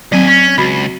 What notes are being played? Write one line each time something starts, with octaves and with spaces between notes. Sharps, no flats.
D#2 F#3 C4 G#5
C#4
C#2 F#4 B5